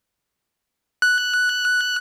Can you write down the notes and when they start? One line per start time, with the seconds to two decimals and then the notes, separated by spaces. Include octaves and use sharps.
1.02 F#6